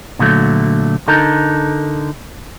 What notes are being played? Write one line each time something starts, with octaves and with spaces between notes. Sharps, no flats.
A#2 D3 F#3 A3
D3 D#4 A4 A#4